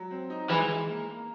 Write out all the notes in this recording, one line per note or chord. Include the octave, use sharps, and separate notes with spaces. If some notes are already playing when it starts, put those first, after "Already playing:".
Already playing: F#3
C4
D#4
E3 G#3
G#3
A#3
A#3